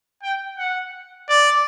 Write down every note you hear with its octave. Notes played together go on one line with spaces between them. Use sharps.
G5
F#5
D5